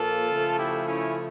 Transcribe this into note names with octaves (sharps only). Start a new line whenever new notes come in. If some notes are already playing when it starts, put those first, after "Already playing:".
Already playing: A#2 F3 A#3 F4 A4
C#3 F3 A3
E4 G4
C#4 E4